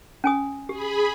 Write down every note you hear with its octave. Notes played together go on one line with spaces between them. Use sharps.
C#4 G#5 D#6
G4 G#4 B5